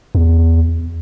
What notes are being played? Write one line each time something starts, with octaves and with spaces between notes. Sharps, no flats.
E2